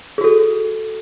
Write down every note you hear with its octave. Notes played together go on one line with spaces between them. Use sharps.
F#4 G#4 A4